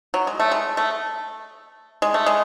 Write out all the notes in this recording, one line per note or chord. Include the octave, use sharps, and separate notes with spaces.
F#3
G#3
A3
G#3
A3
G#3
A3
G#3